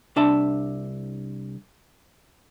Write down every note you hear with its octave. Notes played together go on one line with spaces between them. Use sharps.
C2 D4 E5 A5